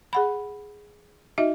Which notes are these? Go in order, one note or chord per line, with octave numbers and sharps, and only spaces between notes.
G#4 F#5 B5
D#4 F#4 D#5 E5